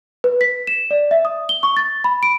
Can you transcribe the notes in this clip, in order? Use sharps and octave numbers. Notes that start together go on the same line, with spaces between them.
B4
B6
E7
D5
E5
D#6
G7
C#6
A6
B5
D7